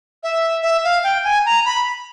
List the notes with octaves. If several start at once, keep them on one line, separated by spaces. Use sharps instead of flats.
E5
E5
F5
G5
G#5
A#5
B5